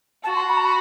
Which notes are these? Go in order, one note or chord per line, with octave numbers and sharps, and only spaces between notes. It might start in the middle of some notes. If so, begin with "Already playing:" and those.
F#4 A5
C6
B5
A5
B5